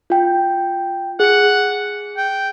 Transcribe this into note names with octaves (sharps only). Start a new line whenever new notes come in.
F4 G5
G#4 F#5 C#7
G5